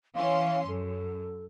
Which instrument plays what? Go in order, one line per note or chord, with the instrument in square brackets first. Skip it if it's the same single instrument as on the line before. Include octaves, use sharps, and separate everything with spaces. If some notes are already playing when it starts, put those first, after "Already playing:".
[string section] E3 C#4 C6 [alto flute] F5
[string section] F#2 [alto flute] A4